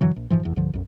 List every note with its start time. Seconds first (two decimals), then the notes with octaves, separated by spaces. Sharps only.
0.01 G2 D3 E3 F#3
0.16 A#1
0.30 F#1 G#2 E3 F3
0.43 F1 E2
0.56 C2 G2 D3 F3
0.73 B1 F#2